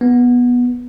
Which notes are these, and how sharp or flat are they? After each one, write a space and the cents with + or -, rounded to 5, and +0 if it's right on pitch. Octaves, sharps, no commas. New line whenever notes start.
B3 -15